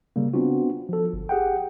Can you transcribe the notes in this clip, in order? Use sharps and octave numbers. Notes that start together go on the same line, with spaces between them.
C#3 G3 A#3
B3 C4 D4 F4 F#4
F3 A4
G1
G4 G#4 F#5 G5